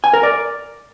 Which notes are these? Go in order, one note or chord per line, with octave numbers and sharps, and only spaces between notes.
G#5
A#4
D5